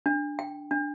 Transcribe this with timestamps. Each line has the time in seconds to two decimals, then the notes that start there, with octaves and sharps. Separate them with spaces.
0.06 D4
0.39 G5
0.71 D4